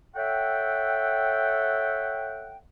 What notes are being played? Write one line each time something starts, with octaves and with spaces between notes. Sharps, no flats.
A4 C#5 E5 F#5 G5